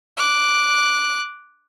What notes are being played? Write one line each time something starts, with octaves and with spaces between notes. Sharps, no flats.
D6 F#6